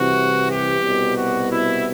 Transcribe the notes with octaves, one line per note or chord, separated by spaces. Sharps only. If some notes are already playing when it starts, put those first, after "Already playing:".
Already playing: C2 C3 E3 F#4
G4
C2 B2
F#4
E4